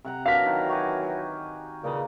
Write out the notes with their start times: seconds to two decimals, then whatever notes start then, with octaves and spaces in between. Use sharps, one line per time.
0.04 C3 F#5 A#5
0.26 E3 F#3 D4 A#4 E5 F5 A#5 B6
0.46 D#3
0.69 F#4 G4 G#5
1.84 E2 A#2 C#3 A#3